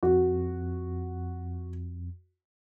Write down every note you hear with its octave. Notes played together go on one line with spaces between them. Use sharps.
F2 F#4